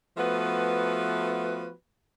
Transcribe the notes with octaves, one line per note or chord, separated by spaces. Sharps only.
F3 A3 B3 F#4 B4